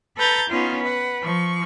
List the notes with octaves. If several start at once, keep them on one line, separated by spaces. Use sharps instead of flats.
A4 B4 A#5 G6 A6
B3 C#4 D#4 F4
B4 F#5
F3 C#6